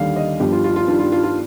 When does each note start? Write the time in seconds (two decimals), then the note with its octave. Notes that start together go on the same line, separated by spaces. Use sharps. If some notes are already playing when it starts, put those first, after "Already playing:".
Already playing: D#2 D3 G3 F5
0.16 D#5
0.40 G1 G2 F3 G4
0.52 F4
0.64 F4
0.76 F4
0.88 G2 D#3 G3 F4
0.99 F4
1.12 F4
1.24 F4